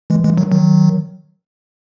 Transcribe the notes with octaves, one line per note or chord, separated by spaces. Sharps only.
E3 G#3
E3 G#3
D#3 F#3
D#3 F#3